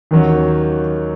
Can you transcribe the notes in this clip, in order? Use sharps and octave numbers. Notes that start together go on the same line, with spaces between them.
D#2 D#3 F#3 C#4